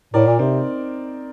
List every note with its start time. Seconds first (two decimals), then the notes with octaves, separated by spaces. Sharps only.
0.14 A2 A#4 D5
0.27 A#2
0.39 C3 C4 D#4